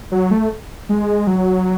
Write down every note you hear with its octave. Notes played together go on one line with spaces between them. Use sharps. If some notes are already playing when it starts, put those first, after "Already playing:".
F#3
A3
G#3
F#3